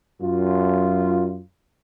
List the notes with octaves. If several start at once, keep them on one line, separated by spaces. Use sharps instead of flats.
F#2 F4